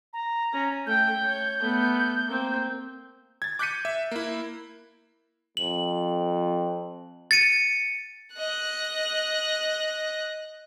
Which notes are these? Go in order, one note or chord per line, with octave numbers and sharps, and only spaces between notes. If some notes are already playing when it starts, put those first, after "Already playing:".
A#5
C#4
A3 G5 G6
C#5
A3 B3
A#3 C4
G#6 A6
D6 F#6 G6 B6 C#7 D#7
E5
A#3 E4
F2 F#7
A6 C#7 D#7
D#5 F#6